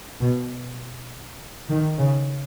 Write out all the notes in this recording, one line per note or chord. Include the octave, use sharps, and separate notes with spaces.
B2
D#3
C#3